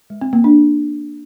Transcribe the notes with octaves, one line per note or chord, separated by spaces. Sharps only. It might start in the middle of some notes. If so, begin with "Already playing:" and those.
G#3
C4
A#3
D4